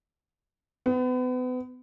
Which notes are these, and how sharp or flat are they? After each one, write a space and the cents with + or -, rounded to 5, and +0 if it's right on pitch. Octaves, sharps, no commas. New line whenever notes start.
B3 +35